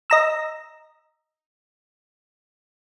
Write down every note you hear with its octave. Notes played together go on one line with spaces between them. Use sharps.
D#5 A#5 E6